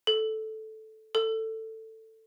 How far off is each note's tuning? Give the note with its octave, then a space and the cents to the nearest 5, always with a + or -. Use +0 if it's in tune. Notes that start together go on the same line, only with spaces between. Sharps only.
A4 -5
A4 +15